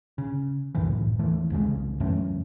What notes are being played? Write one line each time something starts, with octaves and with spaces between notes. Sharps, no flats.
C#3
C2 F#2 A2 E3
D#2 E3 A3
C2 F2 C#3 G#3
F#2 E3 A3 C#4